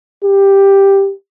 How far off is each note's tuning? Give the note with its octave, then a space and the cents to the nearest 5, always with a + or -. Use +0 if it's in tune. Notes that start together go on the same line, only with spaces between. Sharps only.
G4 +5